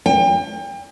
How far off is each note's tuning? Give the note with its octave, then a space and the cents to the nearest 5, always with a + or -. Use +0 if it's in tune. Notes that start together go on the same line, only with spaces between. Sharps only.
G5 +35